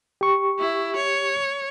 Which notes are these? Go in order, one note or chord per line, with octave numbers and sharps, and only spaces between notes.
G4 C#6
E4
C#5